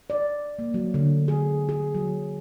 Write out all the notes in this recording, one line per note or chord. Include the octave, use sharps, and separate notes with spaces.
D5
A#3
F#3
D3
G#4
G#4
F#3